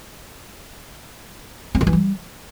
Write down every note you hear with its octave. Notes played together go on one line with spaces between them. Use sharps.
C4
D#3
E3
G3